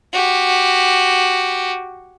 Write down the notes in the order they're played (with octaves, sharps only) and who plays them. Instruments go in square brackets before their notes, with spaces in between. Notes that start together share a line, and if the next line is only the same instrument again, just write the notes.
[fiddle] F#4 G4